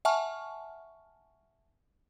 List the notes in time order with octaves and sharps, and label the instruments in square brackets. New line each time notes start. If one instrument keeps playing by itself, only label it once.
[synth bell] E5 F#5 G#5 A5 C#6 F6